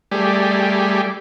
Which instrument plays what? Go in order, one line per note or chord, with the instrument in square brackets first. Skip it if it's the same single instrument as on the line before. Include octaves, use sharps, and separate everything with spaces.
[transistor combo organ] G3 A3 G4 G#4 D5